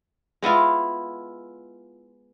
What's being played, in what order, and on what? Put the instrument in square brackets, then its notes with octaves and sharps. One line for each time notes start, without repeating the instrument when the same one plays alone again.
[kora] G#3 B3 E4 F4